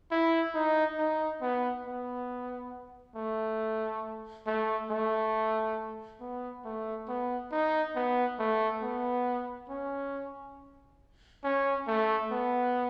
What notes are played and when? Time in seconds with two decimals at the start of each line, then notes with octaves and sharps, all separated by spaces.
0.11 E4
0.55 D#4
0.98 D#4
1.42 B3
1.85 B3
3.16 A3
4.47 A3
4.90 A3
6.20 B3
6.65 A3
7.08 B3
7.52 D#4
7.95 B3
8.39 A3
8.82 B3
9.69 C#4
11.44 C#4
11.87 A3
12.31 B3